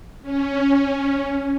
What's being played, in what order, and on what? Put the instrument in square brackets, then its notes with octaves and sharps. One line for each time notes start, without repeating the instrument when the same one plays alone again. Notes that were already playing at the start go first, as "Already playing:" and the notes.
[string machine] C#4